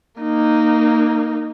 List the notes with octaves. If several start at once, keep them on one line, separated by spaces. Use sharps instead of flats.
A#3 D#4